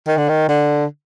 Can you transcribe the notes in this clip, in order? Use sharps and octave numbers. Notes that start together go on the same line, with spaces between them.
D#3
D3
D#3
D3